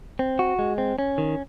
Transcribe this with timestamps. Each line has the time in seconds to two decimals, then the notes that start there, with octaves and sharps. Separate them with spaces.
0.19 C4
0.39 F#4
0.59 G#3
0.78 C4
0.99 C#4
1.18 D#3